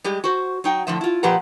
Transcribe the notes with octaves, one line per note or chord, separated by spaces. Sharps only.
G3 G#3 G4
F#4 C5
F#3 D#4 G5
A2 D3 F3 E5
E4 F4
A#2 F3 G4 B4 F#5 A#5